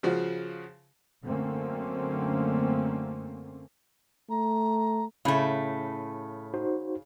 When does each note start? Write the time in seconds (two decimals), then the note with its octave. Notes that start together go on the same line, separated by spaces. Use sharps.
0.03 C#3 F3 F#4
1.23 F#2 D3 A3 A#3 C4 C#4
4.30 A3 A#5
5.25 A2 C#3 A3
6.54 D#4 F#4 C5